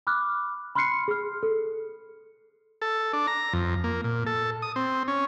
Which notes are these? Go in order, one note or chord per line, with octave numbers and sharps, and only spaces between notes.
B5 D6 F6 F#6
B5 C6 F6 F#6 C7 C#7
G#4 F6
A4
A4
D4
A#5
F2
A#3
A#2
A4
D#6
C4
C#4